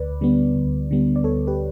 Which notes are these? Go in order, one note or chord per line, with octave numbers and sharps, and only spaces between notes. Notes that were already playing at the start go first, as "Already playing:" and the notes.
Already playing: D2 B4 D5
D3 G3 B3
D2
D3 G3 B3
D5
D2 A4 C#5
G4 B4